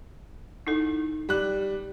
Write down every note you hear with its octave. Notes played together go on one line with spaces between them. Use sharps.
D#4 E4 A4
G3 F#6